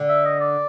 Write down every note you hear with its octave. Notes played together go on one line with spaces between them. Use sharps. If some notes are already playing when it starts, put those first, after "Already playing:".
Already playing: D3
E5
D#5
D5